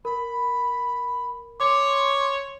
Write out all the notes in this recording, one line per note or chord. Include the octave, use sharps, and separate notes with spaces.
A#4 B5
C#5 C6 D6